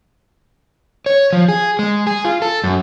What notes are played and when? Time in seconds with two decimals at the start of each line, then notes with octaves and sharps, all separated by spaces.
1.06 C#5
1.33 F3
1.49 G#4
1.79 G#3
2.07 G#4
2.25 F4
2.42 A4
2.64 F#2